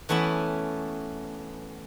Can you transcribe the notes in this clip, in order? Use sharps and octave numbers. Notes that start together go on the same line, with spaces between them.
E3 A3 B3 C#4 E4